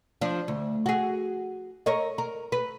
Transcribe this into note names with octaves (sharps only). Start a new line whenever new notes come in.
F3 D4
D2
F#4 G#4
A#4 C#5 D#5
A#4
B4